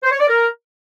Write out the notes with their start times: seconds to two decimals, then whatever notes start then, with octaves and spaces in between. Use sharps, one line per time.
0.03 C5
0.12 C#5
0.20 D5
0.29 A#4